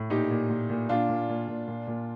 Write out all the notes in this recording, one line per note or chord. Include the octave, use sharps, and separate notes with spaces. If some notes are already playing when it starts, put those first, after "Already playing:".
Already playing: A2
A#2 D#4 G4
A#2
A#2
A#2
A#2 D4 F4
A#2
A#2
A#2
A#2
A#2